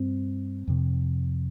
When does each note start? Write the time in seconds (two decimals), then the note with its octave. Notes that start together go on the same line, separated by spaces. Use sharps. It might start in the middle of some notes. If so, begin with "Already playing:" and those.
Already playing: G2 C4
0.68 F2 C3